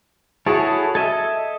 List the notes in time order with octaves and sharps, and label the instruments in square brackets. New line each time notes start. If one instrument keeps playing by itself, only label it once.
[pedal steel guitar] E4 A4 C#5 [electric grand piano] F#4 G#4 A5
[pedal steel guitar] A4 D#5 E5 [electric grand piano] G#6